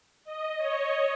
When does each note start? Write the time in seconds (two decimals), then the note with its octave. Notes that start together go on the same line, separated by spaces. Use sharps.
0.25 D#5
0.57 C#5